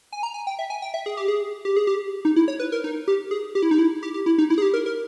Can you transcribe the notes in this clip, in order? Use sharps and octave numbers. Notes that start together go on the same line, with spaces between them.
G#5
A#5
G#5
G5
E5
G#5
G5
E5
G#4
G4
G#4
G4
G#4
G4
D#4
E4
C#5
B4
A#4
D#4
G4
G#4
G4
E4
D#4
E4
G4
G4
E4
D#4
E4
G#4
G4
A#4
A#4